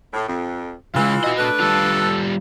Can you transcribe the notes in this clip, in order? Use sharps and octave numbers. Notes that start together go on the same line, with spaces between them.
A2
F2
C#3 E3 G#3 F4
F#4 D#5
A3 D4 B4
G3 F4 A4